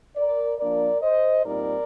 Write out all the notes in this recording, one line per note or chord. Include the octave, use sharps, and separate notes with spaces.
A#4 D5
F3 A#3 D4 A#4 D5
C5 D#5
A#2 G3 C4 D#4 A#4 D5